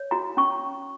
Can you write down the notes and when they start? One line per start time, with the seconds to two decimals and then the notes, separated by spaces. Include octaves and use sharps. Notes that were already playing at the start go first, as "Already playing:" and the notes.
Already playing: C#5
0.11 F#4 A#5
0.37 C#4 C#6